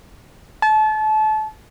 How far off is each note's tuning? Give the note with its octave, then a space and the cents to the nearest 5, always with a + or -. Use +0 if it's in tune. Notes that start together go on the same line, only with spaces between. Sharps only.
A5 -30